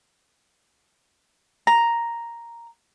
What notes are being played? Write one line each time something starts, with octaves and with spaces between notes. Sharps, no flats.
A#5